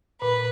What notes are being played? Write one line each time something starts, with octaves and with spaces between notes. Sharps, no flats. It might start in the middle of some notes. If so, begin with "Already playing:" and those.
A#2 B4